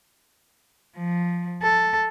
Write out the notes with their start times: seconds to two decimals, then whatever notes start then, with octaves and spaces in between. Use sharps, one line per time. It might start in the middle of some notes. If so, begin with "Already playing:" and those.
0.97 F3
1.63 A4